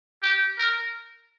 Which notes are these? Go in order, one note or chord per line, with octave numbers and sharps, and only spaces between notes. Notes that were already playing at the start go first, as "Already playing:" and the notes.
G4
A#4